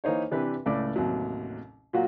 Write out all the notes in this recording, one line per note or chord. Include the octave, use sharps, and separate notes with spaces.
E3 A#3 D#4 C5 C#5
C3 E3 D4 G4 B4
C#2 A2 D5 D6
A1 D#2 C3 F#3
A#2 F#3 F4 F#4